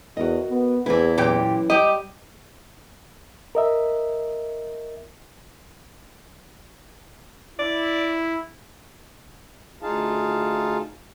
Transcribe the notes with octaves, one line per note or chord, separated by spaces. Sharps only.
E2 F#4 A#4 D#5
B3
E2 E3 C4 E4 G#4 B4
F#2 A#2 E3 G4 G5
G3 G4 D#5 G5
A#4 D#5 E5
E4 D5
D2 D#4 F4 G#4 F5 A5